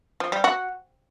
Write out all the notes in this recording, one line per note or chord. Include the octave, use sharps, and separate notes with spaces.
F3
G3
F#4